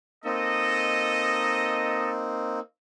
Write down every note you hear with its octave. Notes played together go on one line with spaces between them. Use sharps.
A#3 C4 D#4 A4 D#5